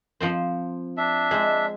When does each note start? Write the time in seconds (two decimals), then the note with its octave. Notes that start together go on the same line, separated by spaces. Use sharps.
0.20 F3 C4 C5
0.97 D4 E5
1.31 G#3 C5